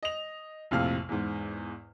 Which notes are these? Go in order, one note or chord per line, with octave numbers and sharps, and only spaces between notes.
D#5 F7
A#1 F2 A2 C3 F5 F6
E2 G#2